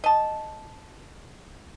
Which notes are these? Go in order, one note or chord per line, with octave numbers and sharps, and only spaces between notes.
D#5 A5